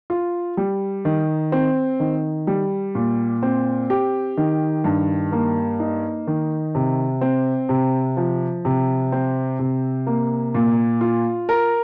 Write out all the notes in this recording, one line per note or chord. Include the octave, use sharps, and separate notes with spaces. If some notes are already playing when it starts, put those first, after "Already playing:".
F4
G3
D#3
C4
D#3
G3
A#2
C4
G4
D#3
G2
A#3
D#4
D#3
C3
C4
C3
F3
C3
C4
C3
A#3
A#2
F4
A#4